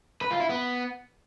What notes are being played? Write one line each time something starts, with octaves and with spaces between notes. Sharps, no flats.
B4
F4
E4
B3